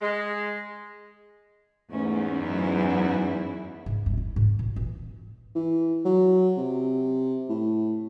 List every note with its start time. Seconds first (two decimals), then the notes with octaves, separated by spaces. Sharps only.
0.01 G#3
1.91 E2 G#2 A3 C#4
2.42 F#2 E4
3.86 G#2
4.06 G2
4.17 E4
4.36 G#2
4.59 A#2
4.76 E3
5.55 E3
6.05 F#3
6.58 C3
7.49 A2